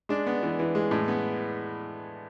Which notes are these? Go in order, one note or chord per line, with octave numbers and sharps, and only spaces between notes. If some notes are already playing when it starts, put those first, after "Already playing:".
G#3 D4
B3
E3
E3
G#3
A2
B3